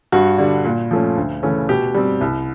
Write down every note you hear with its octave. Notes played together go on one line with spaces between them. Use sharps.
G2 F#4
D3 G3
A#2
F3 A3 C#4
D2
C#3 E3 A3 C#4
B2 G4
G3 C4
C2